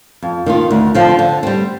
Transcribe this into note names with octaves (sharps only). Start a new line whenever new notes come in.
F2
D#3 A#3 F4
D2
D3 F3 C4 F4
D3
G3 C4